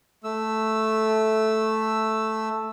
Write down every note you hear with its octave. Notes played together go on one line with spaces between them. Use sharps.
A3 E6